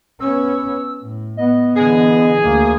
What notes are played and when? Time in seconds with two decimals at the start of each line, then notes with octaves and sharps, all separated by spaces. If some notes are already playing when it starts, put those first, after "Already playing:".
0.20 B3 C#4 E6
1.00 A2
1.37 B3 D#5
1.76 D3 E3 G#4
2.43 D2 A#3